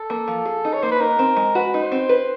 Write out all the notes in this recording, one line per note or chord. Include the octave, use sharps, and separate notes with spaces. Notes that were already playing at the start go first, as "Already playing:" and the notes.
Already playing: A4
A#3
F3
G#4
D#4
C#5
A#3 C5
B4
D#4 A#4
C4
G#3
F#4 B4
D#4
C5
C4
B4